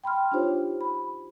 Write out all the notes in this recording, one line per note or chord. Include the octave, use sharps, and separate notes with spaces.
G5 B5 C6 F6
D4 D#4 F4 G4 C5 C#5
B5